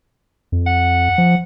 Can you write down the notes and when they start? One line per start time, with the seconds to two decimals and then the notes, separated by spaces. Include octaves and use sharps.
0.52 F2
0.67 F#5
1.18 F3